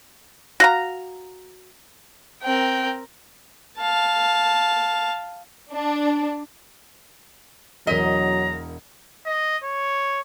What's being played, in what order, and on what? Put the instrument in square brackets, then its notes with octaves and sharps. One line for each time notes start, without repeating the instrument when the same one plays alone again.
[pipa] F#4 F5 A#5
[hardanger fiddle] C4 A#4 [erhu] G5
[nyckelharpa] F5 A5
[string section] D4
[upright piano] E1 A#4 B6 [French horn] F#3 [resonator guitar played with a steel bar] D#5 [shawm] A#5
[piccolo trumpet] D#5
C#5